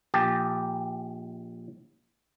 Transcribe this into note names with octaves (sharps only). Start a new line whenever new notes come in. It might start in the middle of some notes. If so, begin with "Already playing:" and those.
A#1 G4 A5